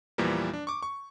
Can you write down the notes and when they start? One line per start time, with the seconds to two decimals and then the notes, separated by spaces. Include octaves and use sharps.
0.18 E2 A#2 E3 F3 G3 A#3
0.53 D4
0.67 C#6 D6
0.83 C#6